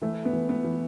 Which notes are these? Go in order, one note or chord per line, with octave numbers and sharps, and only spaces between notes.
E3 A3
B3
E3
B3
E3